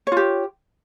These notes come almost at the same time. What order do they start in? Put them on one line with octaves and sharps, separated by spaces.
C#5 F4 G4